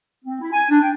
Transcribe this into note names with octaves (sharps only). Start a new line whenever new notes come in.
C4
E4
G#5
D4
G5